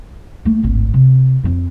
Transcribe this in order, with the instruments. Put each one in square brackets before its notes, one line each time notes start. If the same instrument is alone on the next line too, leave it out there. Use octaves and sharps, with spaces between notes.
[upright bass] A3 A#3
D1 G#1
C3
F2 C4